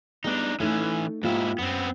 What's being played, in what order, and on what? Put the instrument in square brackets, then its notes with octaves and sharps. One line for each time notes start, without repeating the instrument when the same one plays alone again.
[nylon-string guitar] G3 G#3 B3 [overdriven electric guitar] D4 D#4
[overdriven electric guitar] E3 C#4 [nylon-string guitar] A3 D#4 A4
[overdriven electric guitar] G#2 E4 [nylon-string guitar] A#3 F4 G4
[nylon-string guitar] F#2 [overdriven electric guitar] B3 C4